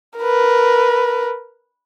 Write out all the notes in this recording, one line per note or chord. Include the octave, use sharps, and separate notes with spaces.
A#4 B4